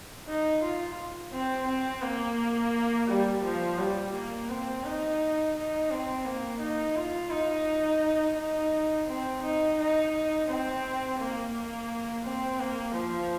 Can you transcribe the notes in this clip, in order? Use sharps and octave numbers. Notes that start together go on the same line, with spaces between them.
D#4
F4
C4
C4
A#3
G3
F3
G3
A#3
C4
D#4
D#4
C4
A#3
D#4
F4
D#4
D#4
C4
D#4
D#4
C4
A#3
A#3
C4
A#3
F3